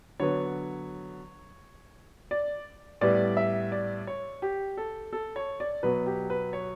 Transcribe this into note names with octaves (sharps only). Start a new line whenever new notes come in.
D3 F#3 B3 C#5
D5
A2 G3 B3 D5
E5
D5
C#5
G4
A4
A4
C#5
D5
B2 F#3 B3 B4
G4
B4
C#5